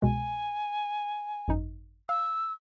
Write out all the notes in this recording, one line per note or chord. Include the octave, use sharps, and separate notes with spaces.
C2 B2 G#3 G#5
G#1 F#2 D#4
F5 E6